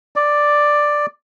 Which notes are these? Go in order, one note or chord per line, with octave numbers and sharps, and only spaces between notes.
D5